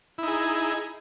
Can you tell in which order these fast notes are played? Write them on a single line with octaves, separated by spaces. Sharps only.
E4 D#4 G#4